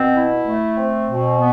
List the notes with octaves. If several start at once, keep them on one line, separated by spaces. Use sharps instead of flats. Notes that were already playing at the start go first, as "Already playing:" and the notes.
Already playing: B2 C4
E4
A3
C4
B2
B3